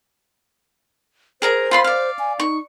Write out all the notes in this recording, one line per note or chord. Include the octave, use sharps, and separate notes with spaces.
G#4 A#4 C5 A#5
F4 B5 C6
D5 F5
G#5
D#4 C#6